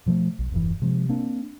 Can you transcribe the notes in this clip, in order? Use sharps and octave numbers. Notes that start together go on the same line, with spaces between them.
B2 F3 G#3 A3
B1
E1 G2 E3
C3 F3 G#3
A#3 C4 D4